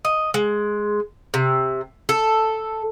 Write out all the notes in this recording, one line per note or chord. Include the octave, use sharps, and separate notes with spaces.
D#5
G#3
C3
A4